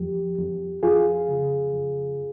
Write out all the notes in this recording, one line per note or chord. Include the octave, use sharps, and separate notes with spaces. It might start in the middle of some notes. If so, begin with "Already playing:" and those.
Already playing: F2 F3 G4
F2
F2 F4 G#4
C#3
F2